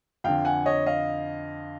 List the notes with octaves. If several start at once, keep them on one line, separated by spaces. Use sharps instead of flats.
F2 D3 F5 G5
F#5 G#5
C#5 D#5
D#5 F5